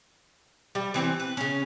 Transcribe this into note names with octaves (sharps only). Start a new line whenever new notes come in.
G3
E3 C4 C5 G5
B4
C#3 C#4